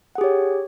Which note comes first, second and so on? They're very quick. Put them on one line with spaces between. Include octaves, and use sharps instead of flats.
F#5 G#4 G4 C#5